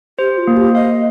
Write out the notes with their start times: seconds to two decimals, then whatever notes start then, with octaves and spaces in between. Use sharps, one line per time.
0.19 G4 C5
0.38 F4
0.47 A#3
0.56 G4
0.75 D#5 F5